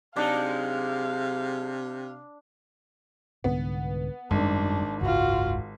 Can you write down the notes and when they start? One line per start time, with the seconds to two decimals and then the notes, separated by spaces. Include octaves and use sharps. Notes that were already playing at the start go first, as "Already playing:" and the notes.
0.16 C3 F#3 G#3 D4 D#4 F5
3.44 C2 G#2 D3 B3
4.31 G#1 F#2 G3 C#4 D4
5.01 F#1 C#2 G#2 F4 F#4